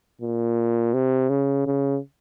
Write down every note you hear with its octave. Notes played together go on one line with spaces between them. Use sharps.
A#2
C3
C#3
C#3